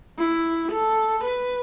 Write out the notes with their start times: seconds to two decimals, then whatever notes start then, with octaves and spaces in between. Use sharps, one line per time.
0.19 E4
0.72 A4
1.24 B4